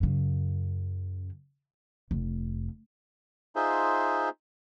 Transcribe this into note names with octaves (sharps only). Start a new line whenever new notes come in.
F#2 C#3
F1
D#4 F4 G#4 C5 E5